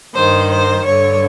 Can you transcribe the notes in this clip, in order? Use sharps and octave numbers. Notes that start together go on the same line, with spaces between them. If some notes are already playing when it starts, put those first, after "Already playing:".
G2 D#3 C5
C5
G2 D3 C#5